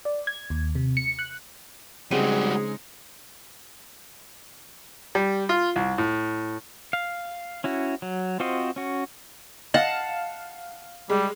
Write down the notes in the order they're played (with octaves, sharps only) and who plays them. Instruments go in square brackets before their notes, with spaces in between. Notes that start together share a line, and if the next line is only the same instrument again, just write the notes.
[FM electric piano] D5
G#6
D#2
C3
C#7
F#6
[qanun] C#3 C4 D#5 [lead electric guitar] G3 F#4 [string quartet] G#3 D#4 [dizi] G#4
[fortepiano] G3
F4
C2
A2
[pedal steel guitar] F5
C#4 E4 F#4
F#3
C4 F4 F#4 C5 D#5
C#4 F#4
[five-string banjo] D#5 [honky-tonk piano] F5 [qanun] F#5 A5
[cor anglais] G3 [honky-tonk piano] G#3